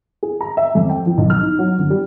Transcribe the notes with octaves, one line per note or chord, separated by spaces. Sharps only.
G#4
A#5
E5
F2
G5
F3
B1
F6
D#4
F#3
G1
G3